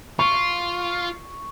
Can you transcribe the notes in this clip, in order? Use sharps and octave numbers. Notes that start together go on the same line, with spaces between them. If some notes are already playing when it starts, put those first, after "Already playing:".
F4 C#6